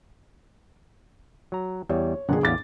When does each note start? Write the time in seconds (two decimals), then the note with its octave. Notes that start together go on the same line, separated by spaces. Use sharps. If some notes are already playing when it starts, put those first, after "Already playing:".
1.52 F#3 A#5
1.89 E2 G3 C#5
2.29 G1 F2 A#2 G#4 F#5
2.43 A1 E2 F5 D6 A6